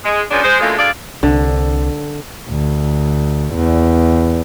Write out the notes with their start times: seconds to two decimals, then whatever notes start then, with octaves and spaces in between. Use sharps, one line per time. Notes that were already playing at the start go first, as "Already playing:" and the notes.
0.04 G#3
0.30 F3 F#3 G#3 B3 C#4 D4
0.43 G#3 C5
0.60 D2 A#2 C#3 G#3 A3 F5
0.77 D2 D4 G#4 D5 F5
1.23 C2 D3
2.50 D2
3.55 E2